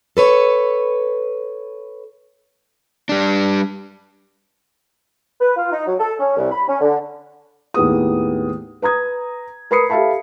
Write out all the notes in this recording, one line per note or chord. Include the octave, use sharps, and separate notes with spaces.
A4 B4 C#5
G3 D4
B4
F4
D#4
F#3
A4
C#4
C2
B5
C#4
D3
D#2 A2 B3 G#4 D#6
B4 A#5 D#6 G#6
A#4 B4 B5 D#6 C7 C#7
G4 A4 E5 F5 A5 B5